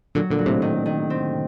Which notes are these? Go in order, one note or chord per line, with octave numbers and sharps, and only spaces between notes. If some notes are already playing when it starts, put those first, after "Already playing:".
A#2 D3 F#3
A#2 D3
F#3
A2 C3
A2 C3 D#3
D#3
C4